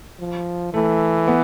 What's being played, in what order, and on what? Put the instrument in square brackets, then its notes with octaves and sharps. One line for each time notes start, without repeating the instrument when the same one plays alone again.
[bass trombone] F3
[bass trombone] E3 [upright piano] A3
[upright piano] B3